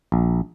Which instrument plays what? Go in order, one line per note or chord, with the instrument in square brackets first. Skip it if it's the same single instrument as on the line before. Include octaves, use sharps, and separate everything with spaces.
[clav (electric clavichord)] A#1